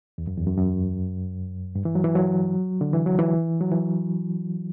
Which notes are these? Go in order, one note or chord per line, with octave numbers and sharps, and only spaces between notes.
E2
F#2
E2
F#2
F#2
G2
E3
F#3
E3
F#3
D3
E3
F#3
E3
F#3
E3